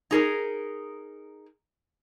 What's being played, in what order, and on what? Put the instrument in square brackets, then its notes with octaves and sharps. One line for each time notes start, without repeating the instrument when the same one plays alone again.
[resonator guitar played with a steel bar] D#4 G#4 A#4